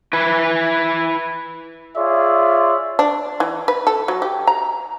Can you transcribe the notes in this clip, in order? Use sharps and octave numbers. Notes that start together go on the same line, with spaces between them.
E4 B4
F4 G#4 C#5 D5 E5
D4
E3
B4
A4
F#3
G4
A#5